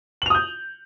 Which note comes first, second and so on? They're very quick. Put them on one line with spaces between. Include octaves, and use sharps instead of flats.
F#7 F7 D#6 G6